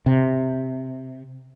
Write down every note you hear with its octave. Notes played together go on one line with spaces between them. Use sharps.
C3